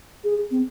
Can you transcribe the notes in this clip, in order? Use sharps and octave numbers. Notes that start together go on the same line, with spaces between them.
G#4
C4